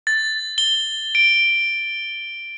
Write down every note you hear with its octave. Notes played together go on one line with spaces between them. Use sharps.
A6
G7
D7